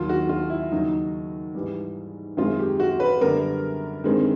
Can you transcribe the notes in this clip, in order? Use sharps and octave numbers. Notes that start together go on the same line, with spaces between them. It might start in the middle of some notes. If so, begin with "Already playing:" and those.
Already playing: D#2 D#3 F#3 F4
F#4
F4
E4
D#2 C#3 F#3 D#4
G#2 E3 G3
F#2 D#3 G#3 C4 F4
G4
F#4
B4
F#2 D3 G3 B3 A#4
G2 D#3 G#3 C4